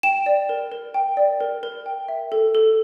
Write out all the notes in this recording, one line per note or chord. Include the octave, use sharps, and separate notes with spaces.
G5 E7
D5
A#4
A#4
G5
D5
A#4
A#4
G5
E5
A4
A4